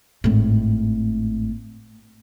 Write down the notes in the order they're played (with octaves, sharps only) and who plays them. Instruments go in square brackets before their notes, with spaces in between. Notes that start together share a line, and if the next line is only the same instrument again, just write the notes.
[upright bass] G#1 A2